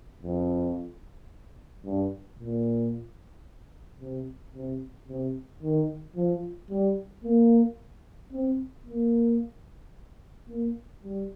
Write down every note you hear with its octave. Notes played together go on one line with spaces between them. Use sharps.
F2
G2
A#2
C3
C3
C3
D#3
F3
G3
A#3
C4
A#3
A#3
G3